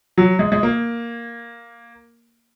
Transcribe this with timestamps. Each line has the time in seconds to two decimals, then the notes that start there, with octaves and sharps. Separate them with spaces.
0.18 F#3
0.39 G#3
0.52 G#3
0.63 A#3